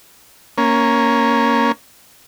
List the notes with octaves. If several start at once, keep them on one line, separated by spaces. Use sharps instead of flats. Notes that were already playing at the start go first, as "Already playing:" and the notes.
A#3 C#4